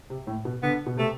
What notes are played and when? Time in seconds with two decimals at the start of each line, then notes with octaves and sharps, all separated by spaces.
0.10 C3
0.27 A2
0.45 B2
0.63 D3 B3
0.86 B2
0.97 C3 A3